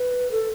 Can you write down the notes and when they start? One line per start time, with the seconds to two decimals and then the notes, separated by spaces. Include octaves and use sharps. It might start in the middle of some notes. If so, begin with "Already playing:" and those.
Already playing: B4
0.31 A4